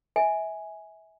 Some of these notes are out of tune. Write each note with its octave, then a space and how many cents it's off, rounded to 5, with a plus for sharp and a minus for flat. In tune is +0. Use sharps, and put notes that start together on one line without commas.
E5 -25 G#5 +0